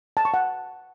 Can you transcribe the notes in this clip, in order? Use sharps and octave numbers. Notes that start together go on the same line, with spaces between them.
A5
C#6
F#5